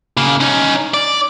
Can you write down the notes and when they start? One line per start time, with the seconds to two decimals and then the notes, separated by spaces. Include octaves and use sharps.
0.17 C#3 A#3
0.41 C#4 D#4
0.94 D5